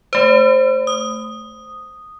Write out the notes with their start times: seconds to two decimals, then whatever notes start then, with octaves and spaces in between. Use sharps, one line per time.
0.13 A3 C5
0.87 D#6